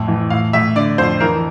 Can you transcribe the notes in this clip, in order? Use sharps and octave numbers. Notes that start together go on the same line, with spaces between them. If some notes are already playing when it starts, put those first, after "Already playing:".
Already playing: F2 A2
E3
A2 F5
A2 E5
D3 D5
F2 C5
E3 A#4